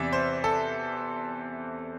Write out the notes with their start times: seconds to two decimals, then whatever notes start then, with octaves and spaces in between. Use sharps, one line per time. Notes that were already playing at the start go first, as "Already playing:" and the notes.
Already playing: E2 C3 E3 D5 E5
0.13 C5
0.44 A4